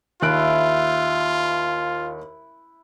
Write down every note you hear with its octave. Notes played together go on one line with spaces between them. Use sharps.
D#2 E4 F4 F#6 D7